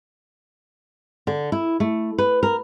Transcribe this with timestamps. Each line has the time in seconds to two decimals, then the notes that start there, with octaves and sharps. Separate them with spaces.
1.27 D3
1.52 E4
1.80 A3
2.18 B4
2.43 A#4